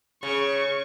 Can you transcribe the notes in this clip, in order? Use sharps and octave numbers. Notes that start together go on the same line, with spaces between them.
C#3 C#6